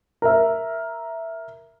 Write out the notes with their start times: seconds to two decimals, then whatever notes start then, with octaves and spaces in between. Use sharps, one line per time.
0.22 A#4 E5